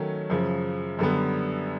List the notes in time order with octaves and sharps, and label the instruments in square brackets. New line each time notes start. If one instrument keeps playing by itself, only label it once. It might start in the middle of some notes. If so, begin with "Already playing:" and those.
Already playing: [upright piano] D#3 F#3 A3 C#4
F#2 C#3 F3
F#2 D3 G3 B3